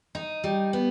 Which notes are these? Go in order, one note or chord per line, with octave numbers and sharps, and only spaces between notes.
D#4
G3
B3